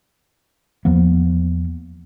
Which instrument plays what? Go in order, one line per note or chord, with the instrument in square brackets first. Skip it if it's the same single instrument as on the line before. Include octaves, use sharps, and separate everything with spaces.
[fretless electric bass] E2 F3 A#3 B3